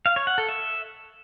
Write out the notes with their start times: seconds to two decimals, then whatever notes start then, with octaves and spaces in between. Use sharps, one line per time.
0.06 F5
0.16 C#5
0.27 F#5
0.38 A4
0.49 E5